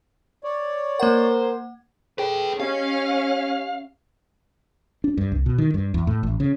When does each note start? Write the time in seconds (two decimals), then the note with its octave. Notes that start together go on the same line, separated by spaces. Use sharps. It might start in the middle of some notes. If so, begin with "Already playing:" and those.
0.44 C#5 D5
1.00 A#3 A#4 C5 F#5
2.18 G#4 A4 B4 G5 B5
2.60 C#4 G4 D#5 F5
5.04 D4
5.18 G2
5.32 C2
5.46 B2
5.58 D#3
5.74 G2
5.94 E2
6.07 A2
6.23 A1
6.40 C#3